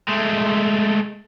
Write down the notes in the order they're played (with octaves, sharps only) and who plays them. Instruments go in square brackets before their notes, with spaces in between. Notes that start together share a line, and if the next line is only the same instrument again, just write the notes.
[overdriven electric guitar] G#3 A3